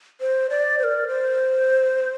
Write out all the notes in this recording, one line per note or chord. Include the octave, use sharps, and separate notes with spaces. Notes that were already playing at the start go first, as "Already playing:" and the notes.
C5
D5
C5
A#4
C5